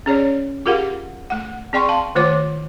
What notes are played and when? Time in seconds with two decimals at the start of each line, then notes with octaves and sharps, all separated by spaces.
0.06 C#4 G#4 C#5 D5
0.66 F4 G4 G#4 A#4 F5 F#5
1.30 A3 F#5
1.73 C4 G#4 D5 G5 C6 C#6
1.89 F5 A5 C6
2.15 D#3 A3 F4 C5 C#5 D6